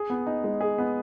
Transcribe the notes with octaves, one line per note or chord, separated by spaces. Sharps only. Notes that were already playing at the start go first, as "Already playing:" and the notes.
Already playing: G#4
B3
D#4
G#3
G#4
B3